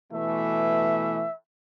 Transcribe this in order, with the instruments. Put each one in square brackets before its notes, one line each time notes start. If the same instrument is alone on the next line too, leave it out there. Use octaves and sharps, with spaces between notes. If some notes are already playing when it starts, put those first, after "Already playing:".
[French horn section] B2 E3 A3 [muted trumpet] E5